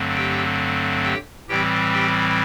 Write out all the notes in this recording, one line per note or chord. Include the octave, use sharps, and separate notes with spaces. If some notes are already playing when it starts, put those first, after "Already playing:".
Already playing: G2 D3 F#3 A3 C4
G4 G5
G4 G5
A2 E3 G3 C4 G4 G5
G4 G5